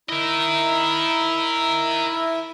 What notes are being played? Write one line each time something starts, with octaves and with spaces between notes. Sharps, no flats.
E4 A#4 D#5 E5